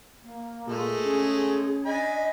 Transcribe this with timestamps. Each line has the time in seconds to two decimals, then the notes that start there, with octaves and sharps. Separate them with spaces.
0.23 A#3
0.67 A#2 G#3 A3 A4
1.05 C#4 G#4
1.85 D4 D#5 G#5 B5